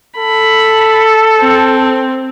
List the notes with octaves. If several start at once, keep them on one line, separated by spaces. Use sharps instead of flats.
A4 B5
C4